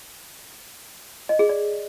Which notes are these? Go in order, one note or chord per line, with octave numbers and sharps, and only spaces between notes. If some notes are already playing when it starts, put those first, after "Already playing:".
D#5
G#4
D5